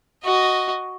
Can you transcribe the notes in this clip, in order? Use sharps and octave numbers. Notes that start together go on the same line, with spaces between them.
F#4 D#5